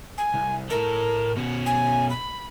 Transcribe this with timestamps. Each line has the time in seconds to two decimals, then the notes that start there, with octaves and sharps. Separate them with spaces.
0.18 G#5
0.34 C2
0.70 A2 A4 A#4
1.37 B2 C#4
1.66 G#5
2.10 B5